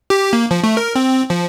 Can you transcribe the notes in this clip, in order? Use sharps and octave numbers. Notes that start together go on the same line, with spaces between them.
G4
A#3
F3
A3
A#4
C4
F3